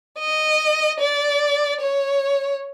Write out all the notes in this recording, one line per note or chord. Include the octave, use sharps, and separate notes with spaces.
D#5
D5
C#5